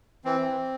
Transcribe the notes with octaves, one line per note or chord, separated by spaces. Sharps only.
E3 C4
E3